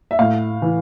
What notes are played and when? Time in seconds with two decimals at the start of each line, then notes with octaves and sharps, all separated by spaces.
0.11 E5
0.19 A2 F5
0.62 E3